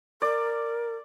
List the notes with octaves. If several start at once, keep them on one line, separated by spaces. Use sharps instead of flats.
A#4 D5